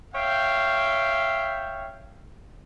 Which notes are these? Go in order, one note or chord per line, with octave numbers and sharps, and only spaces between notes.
C#5 E5 F5 G5